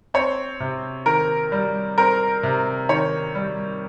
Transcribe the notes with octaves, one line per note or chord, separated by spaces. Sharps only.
C4 C#5
C3
D#3 A#4
G3
C4 A#4
C3
D#3 C#5
G3